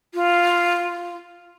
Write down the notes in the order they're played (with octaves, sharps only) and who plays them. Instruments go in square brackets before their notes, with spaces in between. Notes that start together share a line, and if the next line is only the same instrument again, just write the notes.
[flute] F4